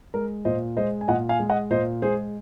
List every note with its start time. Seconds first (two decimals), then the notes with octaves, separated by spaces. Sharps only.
0.14 G#3 A#4
0.45 A#2 C5 D#5
0.77 G#3 C5 D#5
1.01 G#5
1.08 A#2 D#5 F#5
1.29 F5 G#5
1.39 G#3
1.50 D#5 F#5
1.70 A#2 C5 D#5
2.02 G#3 G#4 C5